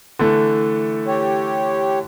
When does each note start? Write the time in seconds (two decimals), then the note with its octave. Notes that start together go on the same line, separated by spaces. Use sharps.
0.19 D3 E3 A3
1.07 G4 C#5